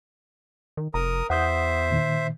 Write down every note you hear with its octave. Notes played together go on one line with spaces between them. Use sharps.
D#3
F1 A#4 A#5 D#6
E2 C5 E5 F#5 D#6 G6
A#2 D#3